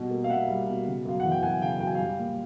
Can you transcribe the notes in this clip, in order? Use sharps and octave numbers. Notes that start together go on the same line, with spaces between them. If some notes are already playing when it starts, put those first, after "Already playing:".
Already playing: B2 G3
A#3
F5
B2 E5 F#5
G3
B2
C#3
F#2 F5
E3 F#5
G5
F#2 F#5 G#5
C#3 F5 G5
F#2 G5
G#5
G3 F5 G5
A#2